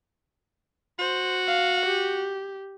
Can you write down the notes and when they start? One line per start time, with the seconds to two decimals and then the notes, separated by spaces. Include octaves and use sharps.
0.99 F#4 C5
1.47 F5
1.86 G4